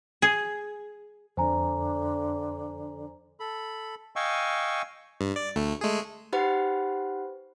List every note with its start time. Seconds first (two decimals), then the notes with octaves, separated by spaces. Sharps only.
0.22 G#4
1.37 F2 D3 C5 G#5 A#5
3.40 A4 B5
4.16 D#5 F5 G5 G#5 C#6 E6
5.21 G2
5.36 D5
5.56 D2 A3
5.81 G#3 A3 G#4
6.33 D#4 G4 B4 C5 F#5 B5